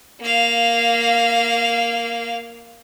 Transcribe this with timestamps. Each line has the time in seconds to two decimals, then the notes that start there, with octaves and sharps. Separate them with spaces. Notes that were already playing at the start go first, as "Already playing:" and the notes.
0.22 A#3 F5